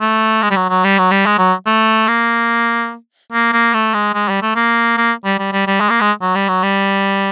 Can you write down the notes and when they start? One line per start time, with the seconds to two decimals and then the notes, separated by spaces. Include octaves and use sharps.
0.01 A3
0.43 G#3
0.51 G3
0.56 F#3
0.70 F#3
0.84 G3
0.98 F#3
1.11 G3
1.26 G#3
1.38 F#3
1.66 A3
2.08 A#3
3.32 A#3
3.53 A#3
3.74 A3
3.94 G#3
4.15 G#3
4.29 G3
4.42 A3
4.56 A#3
4.98 A#3
5.25 G3
5.39 G3
5.53 G3
5.67 G3
5.80 G#3
5.90 A#3
6.01 G#3
6.22 F#3
6.35 G3
6.49 F#3
6.63 G3